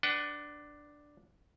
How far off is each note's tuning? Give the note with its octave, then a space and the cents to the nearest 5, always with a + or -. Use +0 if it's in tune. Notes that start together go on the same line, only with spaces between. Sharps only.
D4 +0 B4 +0 F#5 +35